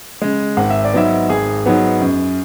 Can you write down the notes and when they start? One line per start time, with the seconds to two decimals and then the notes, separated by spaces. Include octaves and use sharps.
0.22 C#3 G#3
0.57 G#1 F#5
0.70 E5
0.84 D5
0.94 G#2 F#3 B3 E5
1.29 G#1 G#4
1.66 G#2 F#3 B3
2.01 F#2